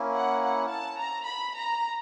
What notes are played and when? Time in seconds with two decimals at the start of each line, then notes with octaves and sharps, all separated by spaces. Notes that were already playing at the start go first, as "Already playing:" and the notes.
Already playing: A#3 C#4 E4
0.15 F#5
0.44 F#5
0.71 A5
0.99 A#5
1.28 B5
1.56 A#5